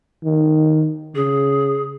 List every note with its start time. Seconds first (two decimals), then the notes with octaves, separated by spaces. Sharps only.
0.24 D#3
1.15 C#3 G#4